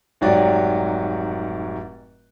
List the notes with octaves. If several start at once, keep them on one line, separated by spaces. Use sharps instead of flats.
F1 G#2 F#3 F#4 G4 D5